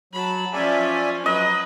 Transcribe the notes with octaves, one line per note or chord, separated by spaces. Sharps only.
F#3 A5 B5
F3 C#4 D5 E5 G#5
F#3 B4 D#5